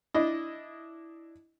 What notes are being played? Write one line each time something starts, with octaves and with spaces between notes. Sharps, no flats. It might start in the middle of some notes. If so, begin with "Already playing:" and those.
D4 E4 D#5